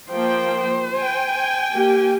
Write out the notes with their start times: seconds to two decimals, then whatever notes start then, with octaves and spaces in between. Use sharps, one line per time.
0.11 F3 A#3 C5 G5
0.96 G5 G#5
1.73 A#3 G4